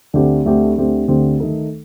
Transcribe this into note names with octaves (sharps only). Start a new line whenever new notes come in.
D2 D3 A3 C4 G4
D2 D3 A3 C4 G4
D2 D3 A3 C4 G4
D2 D3 A3 C4 G4
D#3 A3 D#4 A4